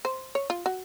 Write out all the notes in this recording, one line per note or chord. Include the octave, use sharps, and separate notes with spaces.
C5
C#5
F4
F#4